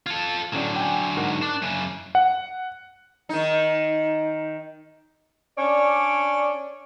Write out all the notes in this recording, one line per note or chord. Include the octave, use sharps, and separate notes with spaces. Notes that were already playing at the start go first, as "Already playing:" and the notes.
F4 A4 G#6
A2 D3 F#3 C#4 D5
G5 G#5
G#2 A#4 F#5
D4 D6 F#6
F#2 C#3
F#5
D#3 D#4
C#4 D4 C#5 D5